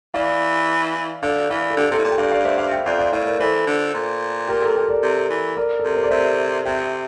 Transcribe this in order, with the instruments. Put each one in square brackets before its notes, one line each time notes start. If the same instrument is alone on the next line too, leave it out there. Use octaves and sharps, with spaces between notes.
[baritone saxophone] E3 [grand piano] D5 F5
[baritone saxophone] D3 [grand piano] D5 F5
[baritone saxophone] E3 [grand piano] D5 F5
[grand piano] A4
[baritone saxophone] D3 [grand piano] G4
[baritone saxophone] C3 [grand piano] A4
[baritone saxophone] A2
A#2
[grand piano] G5
[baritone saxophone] G2 [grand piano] D5 F5
[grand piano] D5 F5
C5 E5
D5 F5
E5 G5
[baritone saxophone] F2 [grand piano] D5 F5
[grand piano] D5 F5
[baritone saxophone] A2 [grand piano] D5 F5
[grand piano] A#4 D5
[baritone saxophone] E3 [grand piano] A4 C5
[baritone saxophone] D3
A#2
[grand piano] G4 A#4
A4
G4 A#4
A#4 D5
[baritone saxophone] C3
E3
[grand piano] A#4 D5
A4
[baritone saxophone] C3 [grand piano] A#4
[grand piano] C5
D5
[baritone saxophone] C3 [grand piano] C5 E5
[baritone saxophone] C3 [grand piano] E5 G5